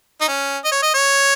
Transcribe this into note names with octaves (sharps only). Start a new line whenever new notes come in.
D#4
C#4
D#5
C#5
D#5
C#5